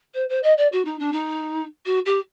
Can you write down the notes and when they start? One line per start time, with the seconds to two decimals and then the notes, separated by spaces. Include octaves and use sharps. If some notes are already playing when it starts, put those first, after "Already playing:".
0.14 C5
0.29 C5
0.43 D#5
0.58 D5
0.72 F#4
0.85 D#4
0.99 D4
1.13 D#4
1.86 F#4
2.06 G4